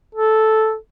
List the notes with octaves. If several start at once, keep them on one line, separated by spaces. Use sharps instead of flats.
A4